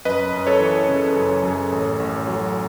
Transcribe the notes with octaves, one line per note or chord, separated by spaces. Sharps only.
F#2 B4 D#5
F#2
A4 C#5
E3
C#3
F#2
F#2
A1
A1
F#3